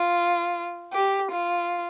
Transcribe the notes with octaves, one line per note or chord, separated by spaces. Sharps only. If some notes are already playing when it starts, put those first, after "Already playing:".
Already playing: F4
G4
F4